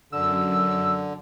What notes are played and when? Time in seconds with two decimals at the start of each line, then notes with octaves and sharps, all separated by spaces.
0.12 F#2 D3 E6